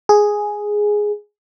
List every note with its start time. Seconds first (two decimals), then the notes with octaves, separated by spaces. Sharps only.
0.09 G#4